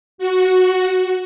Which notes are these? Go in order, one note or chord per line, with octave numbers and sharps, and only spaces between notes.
F#4